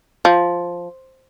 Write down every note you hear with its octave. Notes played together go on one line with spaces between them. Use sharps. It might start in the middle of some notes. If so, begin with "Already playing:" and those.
F3